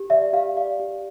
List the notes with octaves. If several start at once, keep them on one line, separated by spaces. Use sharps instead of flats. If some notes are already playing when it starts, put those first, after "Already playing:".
Already playing: G4
D5 E5
G4 F5
D5 F5
G4